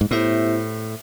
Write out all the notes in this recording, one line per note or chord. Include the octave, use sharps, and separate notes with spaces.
G#2
A2 B3 E4 G4 C5 E5